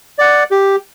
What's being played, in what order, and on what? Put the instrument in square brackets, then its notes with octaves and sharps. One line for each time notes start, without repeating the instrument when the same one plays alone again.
[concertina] D5 F#5
G4